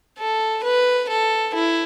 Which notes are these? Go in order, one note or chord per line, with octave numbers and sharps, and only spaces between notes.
A4
B4
A4
E4